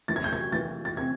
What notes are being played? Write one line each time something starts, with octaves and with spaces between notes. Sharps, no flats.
E3 A6
G#6
G6
G#6
E3 A6
A6
C4 G#6